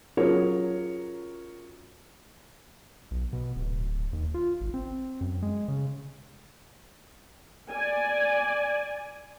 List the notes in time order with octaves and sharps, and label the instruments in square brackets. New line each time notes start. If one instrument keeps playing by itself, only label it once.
[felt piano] F#3 C#4 F4 G#4 A#4 C#5
[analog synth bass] B1
B2
D1
D#2
F4
G#1
C4
F#2
G#3
C#3
[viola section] D5 G#5